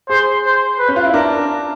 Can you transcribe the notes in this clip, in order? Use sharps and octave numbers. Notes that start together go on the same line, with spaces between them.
G#4 C5
C5
B4
C#4
F4
E4
D4 A#4